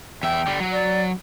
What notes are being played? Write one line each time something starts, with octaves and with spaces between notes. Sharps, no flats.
E2 E5 G5
D3 G3
F#3
D5